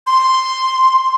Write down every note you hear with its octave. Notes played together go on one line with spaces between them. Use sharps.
C6